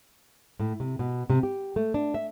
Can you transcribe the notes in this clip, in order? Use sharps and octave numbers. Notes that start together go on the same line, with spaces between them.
A2
C3
B2
C3
G4
A3
D4
E5